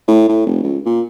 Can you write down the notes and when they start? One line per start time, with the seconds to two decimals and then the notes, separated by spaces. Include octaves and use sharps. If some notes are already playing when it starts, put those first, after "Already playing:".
0.08 A2
0.29 A2
0.46 F1
0.63 C#2
0.86 A#2